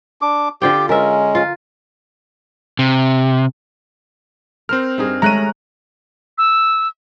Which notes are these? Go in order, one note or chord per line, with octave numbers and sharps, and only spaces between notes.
D4 D6
D3 F4 G4 G5
G#3 C#4 A#4 E5
F4
C3
C4 A#4 C5 F6
G2 D#4 G#4
G#3 A3 C#4 A#5 F#6 D#7
E6